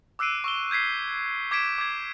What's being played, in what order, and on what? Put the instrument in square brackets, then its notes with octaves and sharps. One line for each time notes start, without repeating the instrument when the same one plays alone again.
[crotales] D6 E6 F#6 C7 D7 D#7
C#6 E6 G7
G6 G#6 B6 C7
D6 G#6 B6 D7 E7
D6 G#6